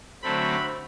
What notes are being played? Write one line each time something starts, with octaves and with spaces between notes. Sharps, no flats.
D3 F#3 A3 C4 B5